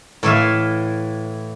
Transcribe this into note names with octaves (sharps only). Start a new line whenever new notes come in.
A2 E3 E5 F5